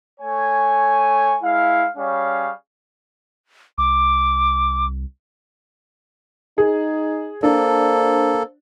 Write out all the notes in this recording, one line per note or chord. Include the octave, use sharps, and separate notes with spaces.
A3 C#5 G#5
G#3 E4 F5
G3 C#4 G#4 C#5 F5
C2 D6
D#4 G#4
A#3 D4 A4 C5